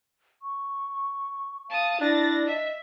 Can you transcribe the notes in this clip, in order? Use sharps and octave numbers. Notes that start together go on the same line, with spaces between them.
C#6
F5 A5 D#6
D4 E4 A6 A#6
D#5 E5